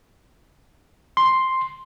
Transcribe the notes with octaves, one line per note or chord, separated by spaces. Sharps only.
C6